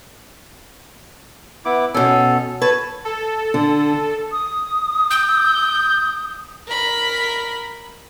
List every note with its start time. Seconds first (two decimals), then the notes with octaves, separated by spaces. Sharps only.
1.65 B3 E4 D6
1.94 B2 C#4 A4
2.62 B4 C#5 A5
3.05 A4
3.54 D3
4.32 D#6
5.11 G6
6.67 A#4 B5